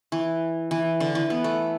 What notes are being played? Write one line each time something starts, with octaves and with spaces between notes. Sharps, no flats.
E3
E3
D3
E3
B3
A3